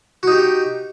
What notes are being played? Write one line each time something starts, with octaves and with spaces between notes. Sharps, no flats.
D#4 F#4 G4